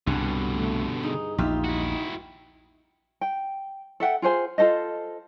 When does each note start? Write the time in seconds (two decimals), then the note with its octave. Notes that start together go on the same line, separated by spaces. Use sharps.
0.07 C2 G2 B2 D3 F#5 G#5
0.55 A3
1.03 D#4 G#4
1.38 A#1 E2 D#4 F4 G4 E5
1.64 E4 F#4
3.21 G5
4.00 A4 E5 F#5 G5
4.22 F4 G#4 C5 G#5
4.58 F4 A4 C5 D#5